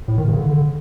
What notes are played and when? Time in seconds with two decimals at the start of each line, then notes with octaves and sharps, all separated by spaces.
0.08 A2
0.18 D#3
0.28 C#3
0.38 D3